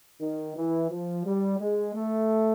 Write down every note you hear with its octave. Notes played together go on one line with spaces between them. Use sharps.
D#3
E3
F3
G3
G#3
A3